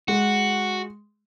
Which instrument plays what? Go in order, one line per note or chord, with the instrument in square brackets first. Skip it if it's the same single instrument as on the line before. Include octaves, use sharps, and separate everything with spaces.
[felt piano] G#3 [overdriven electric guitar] F#4